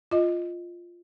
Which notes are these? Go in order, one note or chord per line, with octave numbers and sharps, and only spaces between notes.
F4 D#5